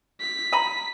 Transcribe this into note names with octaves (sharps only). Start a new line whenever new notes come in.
B6
D#5 A#5 B5